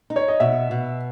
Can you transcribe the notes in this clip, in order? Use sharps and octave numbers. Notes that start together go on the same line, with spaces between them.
D#4
C#5
D#5
B2 E5
B2